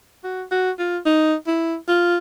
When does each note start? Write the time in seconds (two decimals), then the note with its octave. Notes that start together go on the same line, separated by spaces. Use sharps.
0.24 F#4
0.51 F#4
0.79 F4
1.05 D#4
1.47 E4
1.88 F4